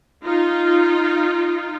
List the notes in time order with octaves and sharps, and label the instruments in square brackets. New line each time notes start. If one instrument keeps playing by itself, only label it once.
[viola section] D#4 F4